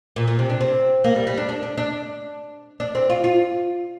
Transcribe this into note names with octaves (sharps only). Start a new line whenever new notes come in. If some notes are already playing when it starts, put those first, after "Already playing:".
A#2
A#2
C3
D4
C4
A#3
G3
G3
D4
D4
D4
D4
D4
C4
F4
F4